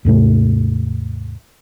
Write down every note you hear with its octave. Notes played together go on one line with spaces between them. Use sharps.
D#2 G#2 C3 A3